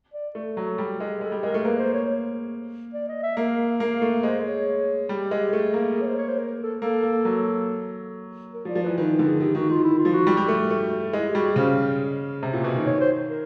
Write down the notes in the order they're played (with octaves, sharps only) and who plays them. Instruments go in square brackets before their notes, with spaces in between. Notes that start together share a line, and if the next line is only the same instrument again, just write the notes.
[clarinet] D5
[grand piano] A3 [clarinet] A4
[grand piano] F#3
G3
G#3
[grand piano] G#3 [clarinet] A4
[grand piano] G3
[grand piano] G#3 [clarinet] A#4
[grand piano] A3
[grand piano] A#3 [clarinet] B4
[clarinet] C5
C#5
D5
D#5
E5
[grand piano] A#3 [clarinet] F5
[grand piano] A#3 [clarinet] F5
[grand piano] A3
[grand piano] G#3 [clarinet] C5
[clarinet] C#5
[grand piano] G3 [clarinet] G4
[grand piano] G#3
A3
A#3
[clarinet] G#4
C#5
C5
C#5
C5
A#4
A4
[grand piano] A#3 [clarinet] A4
[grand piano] A#3
F#3
[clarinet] A#4
[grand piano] F3
[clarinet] D5
[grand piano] F3
[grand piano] E3 [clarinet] B4
[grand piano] D#3 [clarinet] B4
[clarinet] A#4
[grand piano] D3
[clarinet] G#4
[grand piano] D#3 [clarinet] G4
[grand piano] D#3 [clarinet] F#4
[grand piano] D#3 [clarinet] F4
[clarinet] E4
F4
[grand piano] F3
[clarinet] F#4
[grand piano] G3
G3
A3
A3
[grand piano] G#3 [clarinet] E4
[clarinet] G4
[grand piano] G3 [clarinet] F#4
[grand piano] C#3 [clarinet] C5
[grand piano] C3
A#2
B2
D#3
[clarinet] C#5
C5
A#4